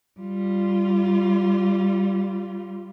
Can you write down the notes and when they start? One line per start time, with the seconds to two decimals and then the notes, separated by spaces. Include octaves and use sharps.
0.20 G3 F4